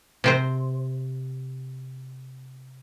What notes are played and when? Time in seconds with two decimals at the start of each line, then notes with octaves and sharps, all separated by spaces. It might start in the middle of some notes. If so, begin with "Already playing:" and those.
0.24 C3 C4 C5